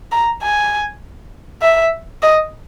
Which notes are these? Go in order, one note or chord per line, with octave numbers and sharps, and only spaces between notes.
A#5
G#5
E5
D#5